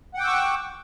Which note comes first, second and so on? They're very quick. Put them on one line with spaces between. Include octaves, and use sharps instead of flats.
F#5 G5 D6 E6 C#6